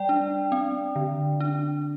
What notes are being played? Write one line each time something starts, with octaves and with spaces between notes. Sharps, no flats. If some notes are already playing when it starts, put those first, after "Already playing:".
Already playing: G3 D5 G5
D4
C4
D3
D4